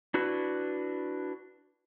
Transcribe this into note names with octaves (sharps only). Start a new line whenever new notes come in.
D4 E4 F#4 B4